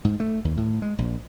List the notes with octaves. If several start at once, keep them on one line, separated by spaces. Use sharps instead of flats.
G#2
A3
D#2
A2
G#3
A#1